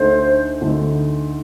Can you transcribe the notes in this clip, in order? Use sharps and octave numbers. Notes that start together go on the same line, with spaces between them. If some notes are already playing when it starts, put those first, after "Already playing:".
Already playing: D2 D3 A3 D#4 C5
D2 D3 A3 D#4